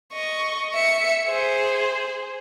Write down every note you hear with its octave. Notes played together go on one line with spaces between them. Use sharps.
D#5 C#6
E5 C#7
G#4 C5